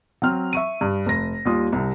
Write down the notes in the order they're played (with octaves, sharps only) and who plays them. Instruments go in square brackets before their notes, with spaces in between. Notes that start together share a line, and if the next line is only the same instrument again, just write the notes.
[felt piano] F#3 C4 F6
E5 C#6 D#7
G2
F1 A#6
D#2 G3 F4 D#6
C2 C3